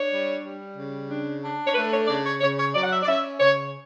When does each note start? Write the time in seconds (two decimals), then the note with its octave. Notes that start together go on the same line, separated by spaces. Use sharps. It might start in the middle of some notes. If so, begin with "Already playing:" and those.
Already playing: D4 C#5
0.09 G3
0.42 G3
0.75 C#3
1.09 D4
1.42 D4
1.67 C#5
1.74 A3 B4
1.91 C#5
2.08 C#3 D5
2.24 C#5
2.41 C#3 C#5
2.57 C#5
2.74 F#3 D5
2.84 F#5
2.91 E5
3.03 D5
3.07 C#4 E5
3.40 C#3 C#5